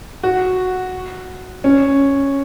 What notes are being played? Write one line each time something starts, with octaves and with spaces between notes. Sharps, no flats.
F#4
C#4